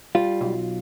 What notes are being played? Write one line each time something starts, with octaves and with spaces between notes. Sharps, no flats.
G3 F4
B1